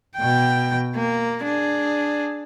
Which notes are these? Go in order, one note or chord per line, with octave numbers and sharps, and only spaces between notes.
B2 G5
A#3
D4 G#4